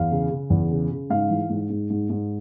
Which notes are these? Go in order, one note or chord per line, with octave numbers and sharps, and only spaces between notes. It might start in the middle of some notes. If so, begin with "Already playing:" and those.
Already playing: E2 F5
C#3
C#3
E2
C#3
C#3
G#2 F5
E3
G#2
G#2
G#2
G#2